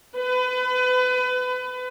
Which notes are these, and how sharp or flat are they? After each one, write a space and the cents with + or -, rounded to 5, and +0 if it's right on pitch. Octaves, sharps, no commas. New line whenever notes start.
B4 +30